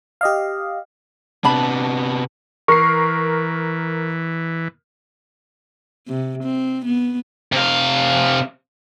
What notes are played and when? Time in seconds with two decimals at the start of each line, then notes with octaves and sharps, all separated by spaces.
0.21 G4 D#5 F5
1.44 C3 B3 D4 A5 B5
2.68 E3 A#4 C#6 C7
6.07 C3
6.44 C4
6.85 B3
7.52 C3 F5